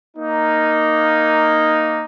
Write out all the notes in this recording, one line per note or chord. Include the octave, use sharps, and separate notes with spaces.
A#3 D#4